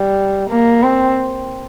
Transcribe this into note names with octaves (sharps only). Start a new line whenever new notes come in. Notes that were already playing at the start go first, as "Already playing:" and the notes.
Already playing: G3
A#3
C4